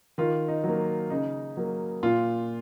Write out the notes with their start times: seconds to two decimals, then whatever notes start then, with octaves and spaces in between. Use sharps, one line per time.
0.18 D#3 F4
0.48 D#4
0.64 F#3 A#3
1.10 C#3 D#4
1.57 F#3 A#3
2.03 A#2 F4